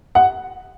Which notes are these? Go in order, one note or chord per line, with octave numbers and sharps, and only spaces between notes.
F#5